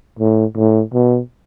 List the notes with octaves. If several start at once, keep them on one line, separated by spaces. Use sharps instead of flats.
A2
A2
B2